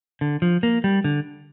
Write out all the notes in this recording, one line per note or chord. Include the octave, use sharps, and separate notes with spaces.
D3
F3
A#3
G3
D3